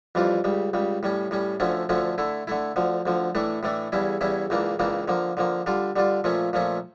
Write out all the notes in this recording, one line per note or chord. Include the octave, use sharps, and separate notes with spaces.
F2 E3 G3 D4 F4
C#2 C#3 G3
C#2 C#3 G3
A2 G3 C#4
A2 G3 C#4
D2 D3 F3 A3 C#4
D2 D3 F3 A3 C#4
D3 A3 E4
D3 A3 E4
D2 D3 F3
D2 D3 F3
A2 E3 A3 D4
A2 E3 A3 D4
E2 C#3 G3 C#4 E4
E2 C#3 G3 C#4 E4
C#2 C#3 E3 A#3 D4
C#2 C#3 E3 A#3 D4
D3 F3 A#3
D3 F3 A#3
D3 G3 D4 F4
D3 G3 D4 F4
A#2 F3 A3 C#4
A#2 F3 A3 C#4